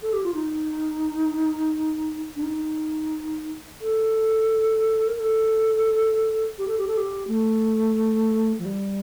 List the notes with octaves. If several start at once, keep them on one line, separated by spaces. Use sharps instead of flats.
A4
G4
F4
D#4
D4
D#4
A4
A#4
A4
G4
A4
G4
A4
G4
A3
F3
G3